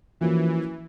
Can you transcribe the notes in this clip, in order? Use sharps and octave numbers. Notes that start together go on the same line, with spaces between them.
E3 F3 A#3 C#4 F#4